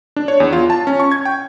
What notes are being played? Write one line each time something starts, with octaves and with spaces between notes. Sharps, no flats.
D4
C#5
E2
F4
A5
C#4
C#6
G#6
G5